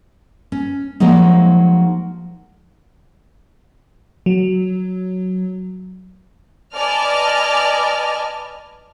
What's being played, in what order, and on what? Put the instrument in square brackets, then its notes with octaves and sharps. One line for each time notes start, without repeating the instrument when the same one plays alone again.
[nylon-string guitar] C#4
F3 F#3 G#3 A#3 D#4
[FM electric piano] F#3
[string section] B4 D5 D#5 G#5 A5 F6